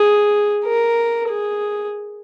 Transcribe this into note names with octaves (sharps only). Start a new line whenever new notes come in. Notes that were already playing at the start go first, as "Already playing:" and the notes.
Already playing: G#4
A#4
G#4